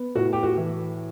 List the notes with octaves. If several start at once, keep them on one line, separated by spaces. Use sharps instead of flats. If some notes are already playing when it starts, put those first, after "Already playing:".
Already playing: B3
A2 F#4
G4
F#4
E3